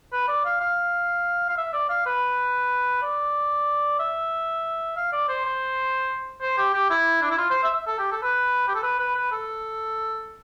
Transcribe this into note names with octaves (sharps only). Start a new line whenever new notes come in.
B4
D5
F5
F5
F5
E5
D5
F5
B4
D5
E5
F5
D5
C5
C5
C5
G4
G4
E4
D4
E4
F4
C5
E5
E5
A4
G4
A4
B4
G4
A4
B4
B4
B4
A4